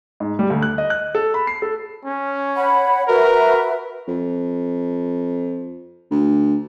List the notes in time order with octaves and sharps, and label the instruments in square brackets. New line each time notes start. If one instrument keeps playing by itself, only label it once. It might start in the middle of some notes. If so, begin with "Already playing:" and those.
[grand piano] G#2
G3
D2
F#6
D#5
F#6
A4
B5
C7
A4
[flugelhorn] C#4
[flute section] C#5 F#5 B5
[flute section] F#4 B4 E5 [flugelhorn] A#4
[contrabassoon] F2
D2